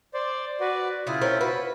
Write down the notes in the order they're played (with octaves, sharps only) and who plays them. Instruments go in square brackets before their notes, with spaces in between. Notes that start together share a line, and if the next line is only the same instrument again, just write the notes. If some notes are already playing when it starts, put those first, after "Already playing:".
[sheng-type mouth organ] C5 D5
F#4 B4 D5
[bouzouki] C#3 G#4 [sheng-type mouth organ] E4 F4
[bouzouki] C4 C#4 A#4
F#4 B4